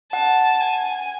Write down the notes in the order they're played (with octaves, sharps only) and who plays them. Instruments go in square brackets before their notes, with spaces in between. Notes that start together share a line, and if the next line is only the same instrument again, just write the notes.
[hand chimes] F#5 [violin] A5
[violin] G#5